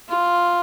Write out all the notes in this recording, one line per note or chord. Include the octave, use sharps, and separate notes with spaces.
F4